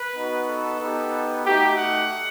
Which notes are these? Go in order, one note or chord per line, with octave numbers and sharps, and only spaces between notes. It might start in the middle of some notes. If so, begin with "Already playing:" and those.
Already playing: B4
B3 D#4 F#4
A4
B3 D#4 G4
A3 D#4 F#4 G4
F#5